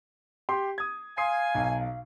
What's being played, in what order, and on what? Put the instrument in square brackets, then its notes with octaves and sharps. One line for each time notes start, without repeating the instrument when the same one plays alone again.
[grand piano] G4 C6
D#6 G#6
[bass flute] F5 [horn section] G#5 [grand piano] C6 D#6 C7
[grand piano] B1